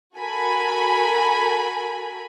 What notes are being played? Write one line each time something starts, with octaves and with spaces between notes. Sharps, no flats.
F#4 A4 A#4 G#5 B5